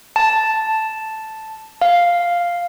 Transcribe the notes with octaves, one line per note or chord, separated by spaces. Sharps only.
A5
F5